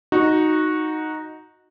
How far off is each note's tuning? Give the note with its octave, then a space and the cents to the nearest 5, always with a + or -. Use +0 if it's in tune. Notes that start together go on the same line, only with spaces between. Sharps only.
D#4 +0 F#4 -10